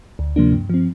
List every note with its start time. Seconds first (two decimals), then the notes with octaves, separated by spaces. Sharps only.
0.19 D2
0.36 C3 F3 A#3 D4
0.52 G2
0.70 F3 C4